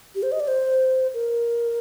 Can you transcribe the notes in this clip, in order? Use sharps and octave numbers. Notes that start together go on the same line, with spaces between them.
G4
C5
D#5
D5
C5
A#4